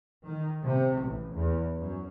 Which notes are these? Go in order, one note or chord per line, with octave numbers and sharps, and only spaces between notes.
D#3
C3
A1
E2
F#2